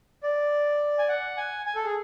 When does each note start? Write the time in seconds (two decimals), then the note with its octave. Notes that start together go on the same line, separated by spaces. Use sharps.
0.23 D5
0.99 G#5
1.09 F#5
1.37 G#5
1.66 G#5
1.76 A4
1.85 G#4